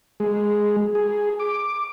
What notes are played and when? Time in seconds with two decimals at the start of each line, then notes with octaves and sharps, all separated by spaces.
0.20 G#3
0.95 G#4
1.40 D6